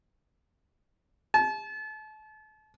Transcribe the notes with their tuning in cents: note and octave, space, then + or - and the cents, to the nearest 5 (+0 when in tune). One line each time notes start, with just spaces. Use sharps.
A5 -35